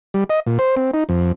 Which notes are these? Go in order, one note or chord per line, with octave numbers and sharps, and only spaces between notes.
G3
D#5
A#2
C5
C4
D#4
F2